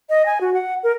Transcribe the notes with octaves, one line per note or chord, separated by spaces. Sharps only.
D#5
G#5
F#4
F#5
A#4